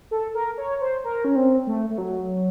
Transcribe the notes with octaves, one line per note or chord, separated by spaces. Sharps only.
A4
A#4
C#5
C5
A#4
C#4
C4
A3
A3
F#3